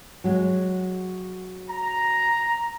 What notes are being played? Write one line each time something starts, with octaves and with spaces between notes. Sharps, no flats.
F#3 G#3
A#5